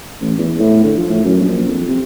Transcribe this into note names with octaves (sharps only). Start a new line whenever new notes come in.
A1
E2
A2
D3
F3
A2
F#2
A#1
F2
C3